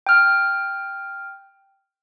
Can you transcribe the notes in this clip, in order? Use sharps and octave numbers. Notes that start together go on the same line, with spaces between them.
G5 F6